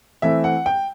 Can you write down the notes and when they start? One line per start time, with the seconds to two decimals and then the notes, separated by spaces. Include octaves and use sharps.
0.22 E3 A3 C4 E5
0.44 F#5
0.66 G5